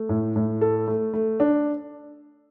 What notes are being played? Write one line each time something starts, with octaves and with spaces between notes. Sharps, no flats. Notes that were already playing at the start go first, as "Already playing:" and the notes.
Already playing: A3
A2
A2
A4
A3
A3
D4